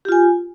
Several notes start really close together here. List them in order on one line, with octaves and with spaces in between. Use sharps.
G4 F4 G#5